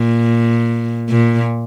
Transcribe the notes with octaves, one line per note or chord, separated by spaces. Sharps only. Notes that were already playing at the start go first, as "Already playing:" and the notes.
Already playing: A#2
A#2